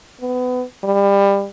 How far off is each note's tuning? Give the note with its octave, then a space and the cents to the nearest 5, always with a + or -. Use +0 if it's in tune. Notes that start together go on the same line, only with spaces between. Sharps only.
B3 +25
G3 +25